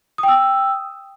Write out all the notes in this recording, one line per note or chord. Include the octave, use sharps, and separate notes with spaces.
G5 D#6 E6